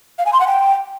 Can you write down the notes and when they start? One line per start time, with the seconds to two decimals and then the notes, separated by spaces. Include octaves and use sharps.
0.19 F5
0.26 G#5
0.33 C6
0.40 F#5
0.47 G5